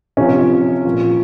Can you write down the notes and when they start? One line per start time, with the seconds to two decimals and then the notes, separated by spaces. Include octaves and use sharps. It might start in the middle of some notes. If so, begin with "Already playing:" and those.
0.17 C3 F3 C#4
0.85 A#2 F3